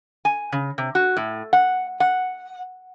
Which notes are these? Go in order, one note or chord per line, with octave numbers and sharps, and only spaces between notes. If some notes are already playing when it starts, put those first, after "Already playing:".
G#5
C#3
C3
F#4
A2
F#5
F#5